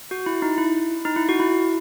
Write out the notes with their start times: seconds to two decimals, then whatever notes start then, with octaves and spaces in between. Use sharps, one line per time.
0.11 F#4
0.26 E4
0.42 D#4
0.58 E4
1.05 D#4
1.16 E4
1.29 F#4
1.40 E4